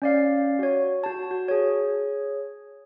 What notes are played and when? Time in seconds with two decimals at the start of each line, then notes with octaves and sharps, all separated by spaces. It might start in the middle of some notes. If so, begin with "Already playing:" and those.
0.02 C#4 D5 F5
0.59 F#4 C#5
1.04 F#4 A5
1.31 F#4
1.48 G#4 C#5